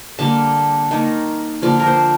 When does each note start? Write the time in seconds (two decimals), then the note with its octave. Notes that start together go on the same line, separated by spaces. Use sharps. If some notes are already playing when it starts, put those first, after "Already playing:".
0.19 D3 G3 A#3 A5
0.91 D#3 A#3 D#4
1.62 D3 F3 A#3 D5
1.80 A#4
1.87 C5